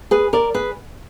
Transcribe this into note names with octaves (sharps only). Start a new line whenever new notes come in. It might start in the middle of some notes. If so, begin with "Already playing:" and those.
G#4 B4
A#4 D5
G#4 B4